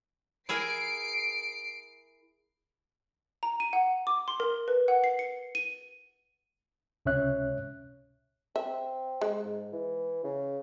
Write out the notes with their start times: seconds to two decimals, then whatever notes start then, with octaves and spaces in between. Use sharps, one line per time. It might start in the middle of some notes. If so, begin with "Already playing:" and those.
0.49 E4 G#4 A#4 C7 D7
3.43 A#5
3.60 D#7
3.73 F#5
4.07 D6
4.28 C6
4.40 A#4
4.68 B4
4.88 F#5
5.04 C7
5.19 C#7
5.55 D#7
7.06 C#2 C3 C#4 C#5 E5 F#6
8.56 C4 E5
9.21 G#3
9.45 G#2
9.73 E3
10.24 C#3